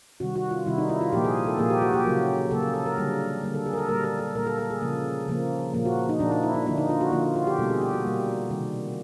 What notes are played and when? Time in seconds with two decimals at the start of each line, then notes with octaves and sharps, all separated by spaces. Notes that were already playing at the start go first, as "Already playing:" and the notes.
0.20 C3 D#3 G3 F#4
0.36 F#4
0.51 F4
0.66 C3 D#3 G3 E4
0.78 D#4
0.90 E4
1.01 F4
1.12 A#2 F3 A#3 G4
1.24 G#4
1.46 A4
1.59 A#2 F3 A#3 G#4
1.70 G4
1.82 F#4
1.94 G4
2.05 C#3 F#3 A#3
2.51 C#3 F#3 A#3 A4
2.63 G#4
2.74 A4
2.86 A#4
2.97 D3 G3 A#3
3.44 D3 G3 A#3
3.55 A4
3.66 G#4
3.74 A#4
3.78 A4
3.89 A#2 G3 A#3 A#4
4.04 A#4
4.20 A4
4.35 A#2 G3 A#3 A#4
4.47 A4
4.59 A4
4.70 G#4
4.82 C#3 F3 A#3
5.28 C#3 F3 A#3
5.74 A#2 F3 A#3
5.85 F#4
6.09 D#4
6.20 A#2 F3 A#3 D4
6.32 D#4
6.43 E4
6.55 D#4
6.66 D3 F3 A#3 D4
6.78 D#4
6.89 F4
7.01 F#4
7.12 D3 F3 A#3 F4
7.24 F4
7.36 F4
7.47 G4
7.58 B2 G3 A#3 A4
7.70 G#4
7.81 G4
7.93 F#4
8.05 B2 G3 A#3
8.50 C3 D#3 G3